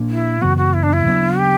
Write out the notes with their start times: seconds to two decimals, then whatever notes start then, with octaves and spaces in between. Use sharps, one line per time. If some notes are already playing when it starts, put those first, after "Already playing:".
Already playing: A#2 A#3 D4
0.10 E4
0.42 F#2 C#3 E3 B3 F#4
0.57 F#4
0.73 E4
0.83 D4
0.93 E4
1.06 C#3 F#3 B3 D4
1.38 G4